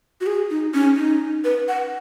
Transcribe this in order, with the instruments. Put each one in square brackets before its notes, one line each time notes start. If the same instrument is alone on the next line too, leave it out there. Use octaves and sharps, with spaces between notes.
[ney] F#4
G#4
D#4
C#4
D#4
B4
F#5